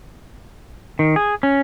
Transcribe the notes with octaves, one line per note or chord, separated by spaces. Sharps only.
D#3
G#4
C#4